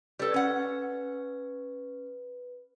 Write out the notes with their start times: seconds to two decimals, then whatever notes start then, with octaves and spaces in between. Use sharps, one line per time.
0.19 G3 A4 B4
0.34 C#4 F#5